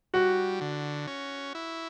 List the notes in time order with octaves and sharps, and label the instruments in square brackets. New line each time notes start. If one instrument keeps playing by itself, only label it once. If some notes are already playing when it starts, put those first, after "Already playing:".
[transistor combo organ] G3 [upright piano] F#4
[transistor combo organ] D3
C#4
E4